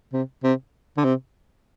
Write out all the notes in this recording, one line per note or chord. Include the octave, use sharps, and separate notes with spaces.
C3
C3
D3
C3